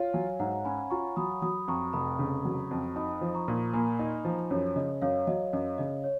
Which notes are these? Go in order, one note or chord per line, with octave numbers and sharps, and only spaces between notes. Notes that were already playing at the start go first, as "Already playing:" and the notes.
Already playing: F4 C#5 F5
F#3 F5 G#5
G#2 F#5 A#5
C#4 G#5 B5
F4 A#5 C#6
F#3 B5 D#6
F#3 B5 D#6
F2 A#5 C#6
F1 B5 D#6
C#3
F#3
F2
D#4 B5 D#6
F3
A#5 C#6
A#2
A#3 G#5 B5
D#4
F3
F#2 C#5
C#3 D#5
F#2 C#5 F5
F#3 D#5
F#2 D#5
C#3 D#5
C#5